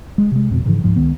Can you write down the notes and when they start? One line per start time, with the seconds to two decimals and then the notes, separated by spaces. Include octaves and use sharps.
0.18 G#3
0.32 C3 G#3
0.49 G#1 F2 B2
0.65 G#2 C#3 E3 F3
0.84 C#2 G#2 F3
0.96 C#2 D#3 B3